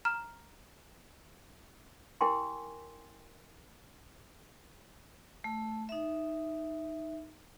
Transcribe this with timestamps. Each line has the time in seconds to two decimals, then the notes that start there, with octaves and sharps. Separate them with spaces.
0.05 A#5 F6 E7
2.21 E4 G4 A#4 G5 G#5 C6
5.44 A3
5.89 D#4 E5